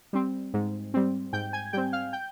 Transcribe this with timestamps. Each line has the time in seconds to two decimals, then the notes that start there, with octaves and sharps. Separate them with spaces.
0.13 G3 C4
0.54 G#2
0.94 G3 C4
1.33 G#2 G5 G6
1.53 G#5 G#6
1.73 G3 C4 G5 G6
1.93 F5 F6
2.13 G5 G6